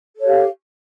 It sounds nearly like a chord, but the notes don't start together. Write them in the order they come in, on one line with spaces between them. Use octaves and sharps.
A4 C#5 G4 F5